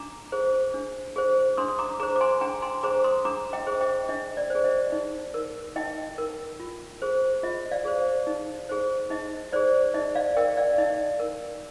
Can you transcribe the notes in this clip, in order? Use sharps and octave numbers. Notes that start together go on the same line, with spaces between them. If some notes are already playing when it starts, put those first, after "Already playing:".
Already playing: D4 A#5 D6
G#4 C5
D4
G#4 C5
D4 C6 D#6
D#6
A#5 D6
G#4 C5 A#5 D6
D6
G#5 C6
D4 G5 A#5
G#5 C6
G#4 C5 A#5 D6
C6 D#6
D4 A#5 D6
D#5 G5
G#4 C5
D#5 G5
D4 D#5
D5
G#4 C5
D#5
D#4
A#4
D#4 D#5 G5
A#4
F4
G#4 C5
F4 D#5
D5 F5
G#4 C5
D#4
G#4 C5
D#4 D#5
G#4 C5 D5
D#4 D#5
D5 F5
A#4 D#5 G5
D5 F5
D#4 D#5
A#4